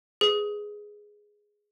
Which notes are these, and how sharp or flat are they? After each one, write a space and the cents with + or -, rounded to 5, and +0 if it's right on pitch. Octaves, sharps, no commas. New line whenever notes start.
G#4 +0 B4 +20